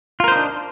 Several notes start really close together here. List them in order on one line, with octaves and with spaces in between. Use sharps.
F4 A#4 C5 D#4 D4